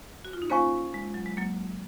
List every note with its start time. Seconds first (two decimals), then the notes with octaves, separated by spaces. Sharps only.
0.25 F#4
0.33 F4
0.42 D#4
0.50 A#3 C#4 F4 C5 F5 G#5 C#6
0.94 G#3
1.14 F#3
1.26 G#3
1.37 F#3 A#3